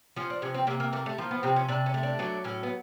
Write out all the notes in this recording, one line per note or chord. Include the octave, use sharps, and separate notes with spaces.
F3 C#4
D4
C3 C#4
C4
C3 A#3
A#3
A3 A#3
A3
F3 A#3
B3
C3 C4
C#4
C3 D4
C#4
A3
D4
F#3 D4
A2 C#4
B3